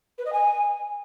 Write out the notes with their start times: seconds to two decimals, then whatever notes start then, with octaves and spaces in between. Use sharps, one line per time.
0.18 B4
0.25 D#5
0.33 G#5